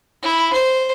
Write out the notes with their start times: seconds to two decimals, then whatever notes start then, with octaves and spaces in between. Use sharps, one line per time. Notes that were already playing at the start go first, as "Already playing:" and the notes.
0.22 E4
0.52 C5